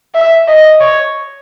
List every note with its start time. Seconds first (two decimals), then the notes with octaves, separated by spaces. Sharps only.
0.14 E5
0.47 D#5
0.80 C#5